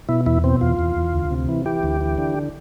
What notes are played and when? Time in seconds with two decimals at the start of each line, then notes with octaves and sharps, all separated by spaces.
0.09 B2 E4
0.26 E2 E4
0.44 B2 C4
0.61 E2 F4
0.79 E2
0.96 E2
1.13 D2
1.31 C3
1.49 E3
1.66 E3 G4
1.83 D2
2.01 E3
2.18 D3